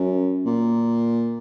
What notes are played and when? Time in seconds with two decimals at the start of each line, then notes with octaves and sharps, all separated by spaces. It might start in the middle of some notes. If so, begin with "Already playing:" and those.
Already playing: F#2
0.45 A#2